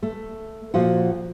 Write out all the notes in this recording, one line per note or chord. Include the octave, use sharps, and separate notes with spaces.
A3
A#2 F3 F#4 F#5